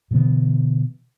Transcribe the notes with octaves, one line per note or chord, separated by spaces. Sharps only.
B2 D3 E3 B3